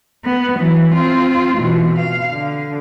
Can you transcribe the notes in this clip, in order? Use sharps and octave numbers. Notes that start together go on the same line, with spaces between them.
B3
E3 F#3
C4 F4
B2 E3
F5
D3